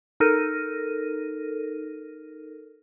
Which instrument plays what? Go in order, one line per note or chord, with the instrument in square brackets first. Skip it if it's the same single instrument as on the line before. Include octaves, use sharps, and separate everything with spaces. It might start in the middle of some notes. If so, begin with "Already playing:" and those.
[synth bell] D#4 A4 A#4 F6 A#6 D#7